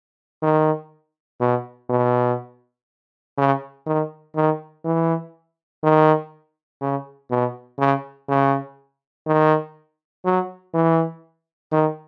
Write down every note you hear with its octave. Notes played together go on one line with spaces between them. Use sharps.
D#3
B2
B2
C#3
D#3
D#3
E3
D#3
C#3
B2
C#3
C#3
D#3
F#3
E3
D#3